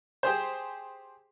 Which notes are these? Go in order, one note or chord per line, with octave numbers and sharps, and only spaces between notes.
G4 G#4 C5